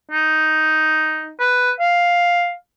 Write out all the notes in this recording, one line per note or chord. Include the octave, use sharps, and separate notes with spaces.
D#4
B4
F5